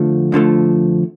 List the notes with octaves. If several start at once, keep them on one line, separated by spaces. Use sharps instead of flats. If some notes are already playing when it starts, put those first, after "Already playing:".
Already playing: F2 D3 F3 A3
F2 D3 F3 A3